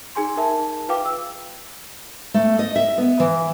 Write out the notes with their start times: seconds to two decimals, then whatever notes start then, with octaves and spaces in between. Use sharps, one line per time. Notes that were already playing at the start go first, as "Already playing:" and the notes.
0.15 D#4 G#4 G#5 C6
0.36 D#4 G#4 A#4 E5 A5
0.88 F4 B4 F5 G5 D6
1.05 E6
2.34 A3
2.59 D#5
2.76 E5
2.98 B3
3.20 E3